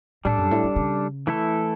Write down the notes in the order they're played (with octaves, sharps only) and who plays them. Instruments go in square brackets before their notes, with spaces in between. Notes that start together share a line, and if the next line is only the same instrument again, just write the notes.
[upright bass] A2 [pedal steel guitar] G3 D4 A4
[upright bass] F#2
A2
C#3
C#3
[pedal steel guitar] E3 A3 E4 A4